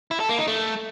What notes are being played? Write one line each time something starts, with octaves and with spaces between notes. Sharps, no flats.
E4
A4
A#3
D#4
A3